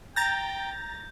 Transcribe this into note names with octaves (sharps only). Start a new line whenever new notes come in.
G5 A#5 G6 A6 A#6